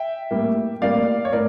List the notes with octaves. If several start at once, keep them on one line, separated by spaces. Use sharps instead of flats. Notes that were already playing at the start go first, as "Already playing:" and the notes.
Already playing: E5 G5
A2 G3 A#3
A2 G3 A#3 D5 F5
C#5
A2 A#4 D5